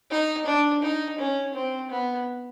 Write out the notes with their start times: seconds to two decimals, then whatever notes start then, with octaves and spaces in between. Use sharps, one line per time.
0.11 D#4
0.46 D4
0.82 D#4
1.18 C#4
1.54 C4
1.90 B3